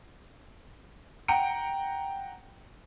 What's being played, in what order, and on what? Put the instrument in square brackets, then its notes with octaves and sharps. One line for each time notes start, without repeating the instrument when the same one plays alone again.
[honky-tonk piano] F#5 G5 A#5 C#7 D7